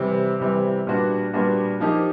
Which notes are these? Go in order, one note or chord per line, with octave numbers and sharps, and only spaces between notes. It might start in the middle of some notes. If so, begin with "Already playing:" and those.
Already playing: C3 E3 G3 C4 E4
C3 E3 G3 C4 E4
A#2 G3 B3 D4 F#4
A#2 G3 B3 D4 F#4
F3 A#3 D#4 G4